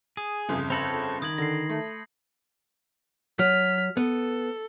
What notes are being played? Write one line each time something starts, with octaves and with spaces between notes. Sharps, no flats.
G#4 D#6
G1 F2 C#3
C4 A4 C#5 B5 C6 A#6
D#3 D#6 G#6 F#7
D3 A#6 C7
A3
F#3 F6 B6
B3 A4